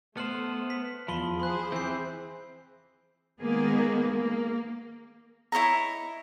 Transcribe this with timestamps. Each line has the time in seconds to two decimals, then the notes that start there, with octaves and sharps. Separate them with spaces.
0.17 A3 B3 C5 A5 F6 F#7
0.70 B6
1.08 E2 F3 B5 C6 G7
1.40 G#4 C5 B5 F#6
1.72 E3 C4 G6 C7
3.41 D#3 G#3 A#3 B3 G#4
4.11 A#3
5.52 E4 C#5 D#5 A#5